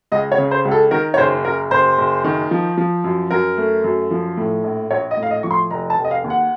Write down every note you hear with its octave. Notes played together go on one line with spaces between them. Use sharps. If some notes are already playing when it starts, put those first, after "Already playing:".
C#2 D#5
C#5
C#3
C5
C#2
A4
D#3 A#4
C#5
F#1 C5
F#1 A#4
F#1 C5
F#1
D#3
F3
F3
F#2
F#2 A#4
A3
F#2
F3
A2
A#1
A#1 C#5
D#5
A2
F5
D#5
F3 C#6
C6
F1 A#5
A5
F1
D#5
F5
D#2
F#5